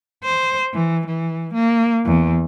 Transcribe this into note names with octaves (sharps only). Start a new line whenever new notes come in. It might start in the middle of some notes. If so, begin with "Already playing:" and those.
C5
E3
E3
A#3
E2